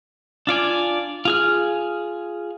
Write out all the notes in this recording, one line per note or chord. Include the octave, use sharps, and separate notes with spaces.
D4 F4 D5 G#5
F4 G#4 F6